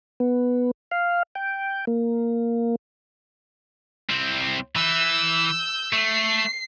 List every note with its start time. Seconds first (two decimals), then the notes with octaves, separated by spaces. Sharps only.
0.20 B3
0.91 F5
1.35 G5
1.87 A#3
4.10 C2 C4
4.76 E3 E6 G6
5.93 A3 C7